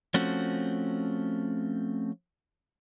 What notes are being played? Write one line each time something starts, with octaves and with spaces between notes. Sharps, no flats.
F3 A3 C4 C#4 F#4